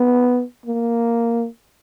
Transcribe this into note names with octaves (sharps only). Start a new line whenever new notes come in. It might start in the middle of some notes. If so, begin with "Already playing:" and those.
Already playing: B3
A#3